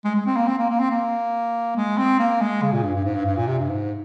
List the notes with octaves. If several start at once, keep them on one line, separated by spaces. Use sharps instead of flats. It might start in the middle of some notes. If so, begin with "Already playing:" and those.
G#3
G#3
C4
A#3
C4
A#3
A#3
C4
A#3
G#3
C4
A#3
G#3
C#3
A#2
G2
G2
G#2
G2
G2
A#2
C3
G2
G#2